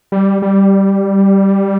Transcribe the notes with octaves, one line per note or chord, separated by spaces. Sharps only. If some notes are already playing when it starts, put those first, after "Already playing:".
G3
G3